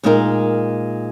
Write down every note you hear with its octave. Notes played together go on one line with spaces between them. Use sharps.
A#2 G#3 D#4 A#4